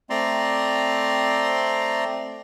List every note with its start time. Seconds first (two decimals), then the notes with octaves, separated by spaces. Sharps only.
0.10 A3 C4 D5 A#5 C6